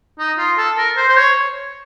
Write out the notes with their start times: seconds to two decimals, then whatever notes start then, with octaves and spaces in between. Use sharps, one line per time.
0.19 D#4
0.38 F4
0.58 A4
0.77 A#4
0.96 C5
1.09 C5
1.17 C#5